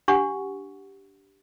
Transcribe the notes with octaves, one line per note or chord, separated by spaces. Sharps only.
D4 G4 F#5 C#6